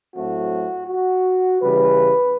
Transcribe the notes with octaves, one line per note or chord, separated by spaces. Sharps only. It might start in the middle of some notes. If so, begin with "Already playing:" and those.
A2 F#3 A3 C4 F#4
F#4
C#3 E3 G3 B4